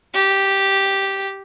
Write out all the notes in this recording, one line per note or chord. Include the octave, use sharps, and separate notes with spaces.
G4